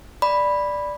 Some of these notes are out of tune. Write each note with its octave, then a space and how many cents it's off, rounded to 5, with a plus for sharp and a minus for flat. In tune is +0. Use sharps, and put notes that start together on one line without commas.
D5 +0 B5 +0